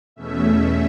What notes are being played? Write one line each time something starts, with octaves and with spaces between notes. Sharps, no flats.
E2 B2 A3 C#4 E5